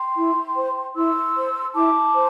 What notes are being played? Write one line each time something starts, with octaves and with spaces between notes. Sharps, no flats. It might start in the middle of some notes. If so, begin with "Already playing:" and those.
Already playing: G5 C6
E4
C5
E4 C6 E6
C5
E4 A5 D6
C5